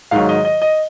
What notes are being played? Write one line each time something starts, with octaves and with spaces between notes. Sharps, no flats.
G#2 D#3 F#3 F5
D#5
D#5
D#5